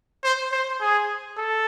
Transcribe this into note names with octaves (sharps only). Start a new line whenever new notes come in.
C5
C5
G#4
A4